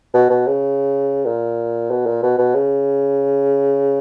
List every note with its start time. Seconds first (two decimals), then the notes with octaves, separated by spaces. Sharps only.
0.14 B2
0.30 B2
0.47 C#3
1.26 A#2
1.90 B2
2.06 A#2
2.23 B2
2.38 B2
2.54 C#3